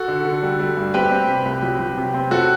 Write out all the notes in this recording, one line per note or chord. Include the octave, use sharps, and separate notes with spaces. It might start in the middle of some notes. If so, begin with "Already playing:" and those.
Already playing: F#4 A4
D3
D3
G3
G3
G2
C4 G4 B4
C4
C3
C2
F#3
F#3
C3
C4
F#3 F#4 A4